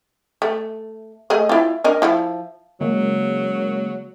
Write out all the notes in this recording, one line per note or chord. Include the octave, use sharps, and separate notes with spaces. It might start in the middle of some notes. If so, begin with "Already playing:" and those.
A3
A3 G#4 D#5
E4 F4
D4 A#4 D#5
F3 E4
C#3 F#3 G#3 A#3